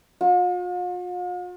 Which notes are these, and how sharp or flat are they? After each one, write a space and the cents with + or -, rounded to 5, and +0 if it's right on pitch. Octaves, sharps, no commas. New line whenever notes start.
F4 +45